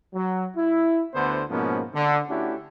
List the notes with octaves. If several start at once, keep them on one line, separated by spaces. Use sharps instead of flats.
F#3
E4
D2 D3 B3 C5
G#2 B2 F3 A#3 B3 C#4
D3
A3 C#4 D4 E4 F#4 G4